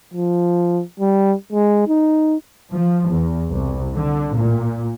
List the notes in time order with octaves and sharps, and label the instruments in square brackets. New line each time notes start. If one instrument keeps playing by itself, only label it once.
[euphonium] F3
G3
G#3
D#4
[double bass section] F3
E2
C2
D3
A#2